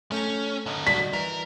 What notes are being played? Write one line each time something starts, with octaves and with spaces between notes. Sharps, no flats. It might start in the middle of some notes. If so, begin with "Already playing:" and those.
A3 C#4 G5 A#5
D3 D#4
G3 F#4 B6
E3 A#4